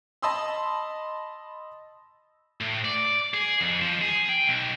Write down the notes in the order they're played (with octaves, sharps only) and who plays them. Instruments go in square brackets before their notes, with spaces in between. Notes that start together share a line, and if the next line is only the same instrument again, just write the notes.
[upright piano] D#5 A5 B5 C6 D#6 E6
[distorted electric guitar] A2
D5
G#4
F2
F3
G#4
G5
B1